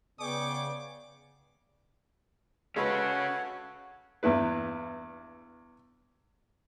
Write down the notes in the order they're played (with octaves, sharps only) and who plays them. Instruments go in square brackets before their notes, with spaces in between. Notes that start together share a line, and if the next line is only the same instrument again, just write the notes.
[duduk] C#3 [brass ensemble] B3 D5 [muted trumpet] G#4 [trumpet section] G5 C#6 D6
[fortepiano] G#3 B4 [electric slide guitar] C#4 F5 [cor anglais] F#4 [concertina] A4 C#5 F#5
[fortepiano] E2 G2 E4 B4